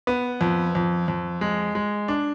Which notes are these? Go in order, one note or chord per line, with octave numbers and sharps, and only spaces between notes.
B3
F2
F2
F2
G#3
G#3
D4